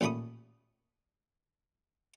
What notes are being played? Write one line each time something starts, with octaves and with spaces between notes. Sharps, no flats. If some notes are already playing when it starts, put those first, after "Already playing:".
A1 A#2 A3 B5 C#6 D#6